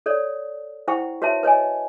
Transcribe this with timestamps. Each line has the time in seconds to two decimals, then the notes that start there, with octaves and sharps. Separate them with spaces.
0.06 A4 C#5 D5
0.88 E4 C5 F#5 G5 C#6
1.22 F#4 B4 C#5 E5 A5
1.43 B4 C#5 D#5 G#5